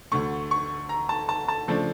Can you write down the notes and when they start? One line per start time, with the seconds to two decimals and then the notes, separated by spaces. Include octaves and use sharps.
0.12 D2 D3 A3 C#6
0.51 C#6
0.89 A#5
1.09 A5
1.29 A5
1.48 A5
1.68 C#3 F3 A3 D4